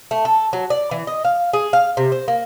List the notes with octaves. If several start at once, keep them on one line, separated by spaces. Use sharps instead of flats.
A3
A4
F#3
D5
E3
D#5
F5
G#4
F5
C3
C5
A#3